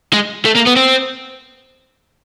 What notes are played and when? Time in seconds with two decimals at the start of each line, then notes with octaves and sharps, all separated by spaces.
0.13 G#3
0.45 A3
0.55 A#3
0.66 B3
0.76 C4